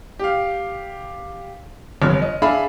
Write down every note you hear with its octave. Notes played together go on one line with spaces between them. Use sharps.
G4 F5
G1 F2 C#5 F6
D#5
D4 G#4 E5 F5 B5